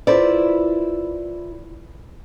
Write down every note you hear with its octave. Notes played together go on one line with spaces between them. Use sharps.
E4 F4 A4 B4 C5 D5